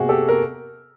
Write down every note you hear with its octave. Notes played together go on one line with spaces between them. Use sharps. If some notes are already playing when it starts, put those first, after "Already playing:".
Already playing: C3 A#3 F#4 G#4
G4 A4
A#4